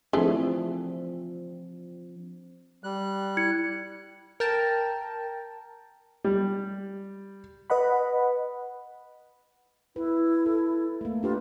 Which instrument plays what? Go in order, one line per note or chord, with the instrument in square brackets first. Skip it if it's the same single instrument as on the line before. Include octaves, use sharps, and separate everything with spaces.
[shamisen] E3 A3 G#4 [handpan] F3 C4 D4
[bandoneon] G3 F#6
[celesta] E4 G#6 C#7
[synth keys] A#4 G5 A5
[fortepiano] G3
[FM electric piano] B4 D#5 F#5 B5
[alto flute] E4 [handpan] B4
[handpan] A4
A3 A#3
[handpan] D4 G4 B4 [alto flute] F4